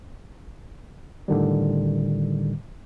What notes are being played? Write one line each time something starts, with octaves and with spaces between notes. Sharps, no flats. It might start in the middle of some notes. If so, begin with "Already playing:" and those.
A2 D3 D#3 G3